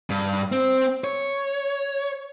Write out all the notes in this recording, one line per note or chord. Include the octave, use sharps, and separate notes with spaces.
G2
C4
C#5